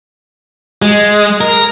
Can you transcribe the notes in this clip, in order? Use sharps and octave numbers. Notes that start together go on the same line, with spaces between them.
G#3
A#4